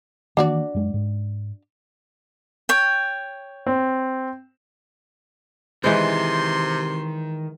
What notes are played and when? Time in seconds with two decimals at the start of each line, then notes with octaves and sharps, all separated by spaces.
0.37 D#3 E3 A#3 D4 F#4 D5
0.74 F#2 G#3
0.94 G#2
2.69 C#5 G5
3.66 C4
5.84 C3 D#3 E3 G#3 C5 C6